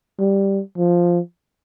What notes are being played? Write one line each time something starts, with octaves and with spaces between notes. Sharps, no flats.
G3
F3